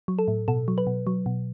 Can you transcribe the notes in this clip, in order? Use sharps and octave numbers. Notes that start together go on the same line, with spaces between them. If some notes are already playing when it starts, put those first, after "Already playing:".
F#3
A4
A2
B2 A4
F#3
B4
B2
F#3
B2